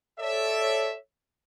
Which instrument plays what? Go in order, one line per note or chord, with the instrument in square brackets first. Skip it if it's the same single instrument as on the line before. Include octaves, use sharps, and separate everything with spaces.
[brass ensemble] A4 C#5 D5 E5